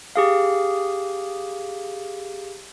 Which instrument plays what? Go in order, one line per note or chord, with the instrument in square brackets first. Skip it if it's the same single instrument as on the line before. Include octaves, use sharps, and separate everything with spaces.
[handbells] G4 G#4 F5